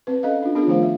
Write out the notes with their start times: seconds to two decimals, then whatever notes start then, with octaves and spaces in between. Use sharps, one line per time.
0.07 C4 B4
0.23 C#4 A4 D#5 F5
0.42 D4 F4
0.55 B3 D4 F4 G#4 A#4
0.67 D#3 F3 A3 F4 C5 F5
0.83 E5